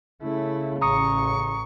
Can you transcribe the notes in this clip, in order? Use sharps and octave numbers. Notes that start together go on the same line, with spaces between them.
C#3 A3 E4
A1 A2 A#5 C#6 D#6 C#7